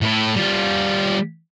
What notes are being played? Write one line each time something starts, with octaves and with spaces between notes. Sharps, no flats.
A2 E4
G3 F4